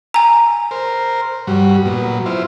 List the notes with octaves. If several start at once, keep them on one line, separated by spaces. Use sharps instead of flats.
G#5 A#5
A#4 C5
G2 G3 F#4
A#2 F#3 B3
E4 F4 C5